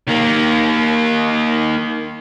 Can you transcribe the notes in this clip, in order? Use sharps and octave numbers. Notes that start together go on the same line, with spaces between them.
D#3 A#3